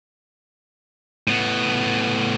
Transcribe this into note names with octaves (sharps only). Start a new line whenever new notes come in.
A2 B3